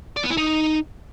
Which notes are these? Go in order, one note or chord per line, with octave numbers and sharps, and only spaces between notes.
D5
B3
E4
D#4